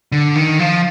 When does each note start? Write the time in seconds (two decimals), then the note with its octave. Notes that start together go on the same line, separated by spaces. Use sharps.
0.12 D3
0.36 D#3
0.59 F3